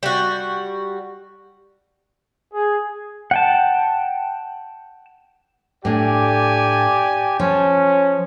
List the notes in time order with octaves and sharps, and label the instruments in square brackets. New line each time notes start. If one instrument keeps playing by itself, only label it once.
[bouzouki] G3 F#4
[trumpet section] G#4
[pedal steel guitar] F#5 G5 A5
[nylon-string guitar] A2 D4 [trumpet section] G4 D5 G#5
[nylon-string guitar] F3 [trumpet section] C#4